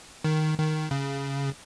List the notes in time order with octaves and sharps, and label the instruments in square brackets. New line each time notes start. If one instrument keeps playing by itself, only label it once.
[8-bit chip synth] D#3
D#3
C#3